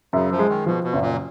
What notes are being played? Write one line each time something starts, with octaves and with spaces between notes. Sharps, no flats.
F#2 C#3
F3
G#3
D#3
B2 F3
B2
F#1
A#2